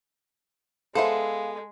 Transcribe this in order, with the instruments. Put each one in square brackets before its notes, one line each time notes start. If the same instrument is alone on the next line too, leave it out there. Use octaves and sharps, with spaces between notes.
[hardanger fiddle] G#3 [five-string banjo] B3 C5 E5 [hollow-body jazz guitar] A4 [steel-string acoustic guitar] F5